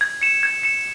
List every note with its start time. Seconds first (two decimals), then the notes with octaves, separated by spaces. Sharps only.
0.01 G#6
0.22 C#7 E7
0.43 G#6
0.63 C#7 E7